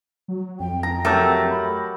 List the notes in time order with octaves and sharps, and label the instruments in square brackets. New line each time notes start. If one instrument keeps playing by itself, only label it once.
[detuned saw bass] F#3
[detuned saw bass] F2 [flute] G5
[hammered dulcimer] A#5
[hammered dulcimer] F#3 G4 A#4 [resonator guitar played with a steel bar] A3
[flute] B5